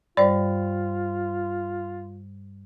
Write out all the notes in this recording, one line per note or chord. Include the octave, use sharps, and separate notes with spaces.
G2 G3 F4 C5 D5